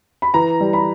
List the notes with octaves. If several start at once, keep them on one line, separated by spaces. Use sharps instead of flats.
B5
E3 A#5
G3
B5